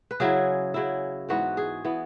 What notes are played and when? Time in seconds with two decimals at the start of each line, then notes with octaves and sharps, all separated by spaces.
0.11 B4
0.20 C#3 F#3 E4 G#4
0.74 C#3 F#3 E4
1.29 G#2 E3 B3 F#4 B4
1.57 G#4
1.85 E3 B3